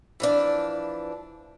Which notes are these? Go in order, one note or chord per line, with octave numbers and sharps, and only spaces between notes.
E3 F3 D4